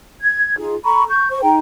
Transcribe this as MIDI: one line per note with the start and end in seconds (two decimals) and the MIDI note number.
0.21 0.57 92
0.58 0.74 63
0.58 0.74 65
0.58 0.74 68
0.84 1.04 69
0.84 1.04 82
0.84 1.04 83
0.84 1.04 85
1.09 1.27 85
1.09 1.27 91
1.30 1.40 72
1.30 1.40 85
1.42 1.59 63
1.42 1.59 68
1.42 1.59 79
1.42 1.59 82